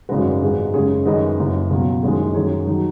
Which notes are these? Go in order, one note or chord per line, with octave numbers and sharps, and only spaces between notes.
G#1 F#2 C#3 G#3 F#4 B4
G#1 G#2 G#3
F#2 C#3 G#3 G#4 C#5
F#2 D#3 G#3 B4 D#5
F#1 F#2 C#3
C#2 B2 F#3
F#1 F#2 D#3 G#3 G#4 C#5
F#2 D#3 F#3 G#4 C#5
D#3 F#3